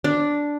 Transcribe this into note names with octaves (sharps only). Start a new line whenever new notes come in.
D4